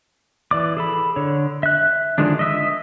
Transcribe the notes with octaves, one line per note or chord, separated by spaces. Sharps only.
E3 D5 D6
G#4 A4 B5
D3 C#5
E5 F#6
D3 D#3 F3 G#3 D4
D#5 E5 D#6